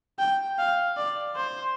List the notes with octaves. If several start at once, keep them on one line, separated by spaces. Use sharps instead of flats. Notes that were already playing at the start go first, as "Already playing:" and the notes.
G5
F5
D5
C5